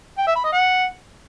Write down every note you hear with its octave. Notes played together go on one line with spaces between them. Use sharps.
G5
E5
B5
D#5
F#5